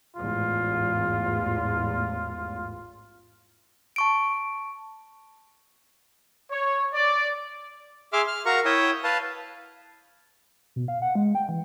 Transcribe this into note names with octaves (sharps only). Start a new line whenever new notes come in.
A1 E2 G#2 F4
A5 C#6 D7
C#5
D5
G#4 E5 C6 D6 F6
F6
F#4 A#4 F5 A#5 C#6
E4 C#5 E5 G5 D#6
B4 F5 A5
B2
F5
F#5
G#3
G5
E3